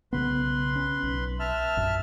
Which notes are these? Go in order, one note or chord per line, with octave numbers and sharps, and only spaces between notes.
B1 C#3 B3 B4 C6
C#4
B1
E5 A5 F6
A#1 F#2